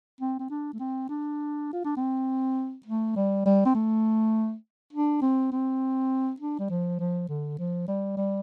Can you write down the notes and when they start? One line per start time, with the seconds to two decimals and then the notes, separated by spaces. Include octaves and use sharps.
0.21 C4
0.39 C4
0.50 D4
0.73 A3
0.80 C4
1.09 D4
1.73 F4
1.85 D4
1.97 C4
2.86 A3
3.16 G3
3.46 G3
3.66 C4
3.75 A3
4.93 D4
5.22 C4
5.52 C4
6.40 D4
6.59 G3
6.70 F3
6.99 F3
7.29 D3
7.59 F3
7.88 G3
8.17 G3